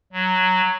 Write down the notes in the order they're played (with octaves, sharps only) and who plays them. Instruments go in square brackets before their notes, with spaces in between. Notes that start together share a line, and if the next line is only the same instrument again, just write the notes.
[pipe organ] F#3